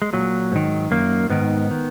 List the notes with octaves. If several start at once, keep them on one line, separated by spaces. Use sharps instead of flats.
G#3
A#2 F#3
G#2 D#3
F#2 D#3 A#3
G#2 D#3 B3
D#3